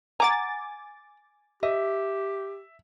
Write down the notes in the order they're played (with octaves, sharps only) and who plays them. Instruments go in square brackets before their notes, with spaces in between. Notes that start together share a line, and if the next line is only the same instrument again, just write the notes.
[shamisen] F#5 A#5 [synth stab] G#5 D6 A6
[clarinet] G4 [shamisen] D#5 [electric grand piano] E5